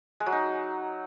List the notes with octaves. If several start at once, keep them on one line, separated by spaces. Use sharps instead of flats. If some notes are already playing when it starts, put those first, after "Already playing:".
G#3
F#3
D#4